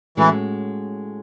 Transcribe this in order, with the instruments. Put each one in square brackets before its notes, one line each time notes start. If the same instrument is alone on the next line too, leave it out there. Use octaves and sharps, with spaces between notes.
[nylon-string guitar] A2 G#3 C#4 F#4 A4 [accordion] E3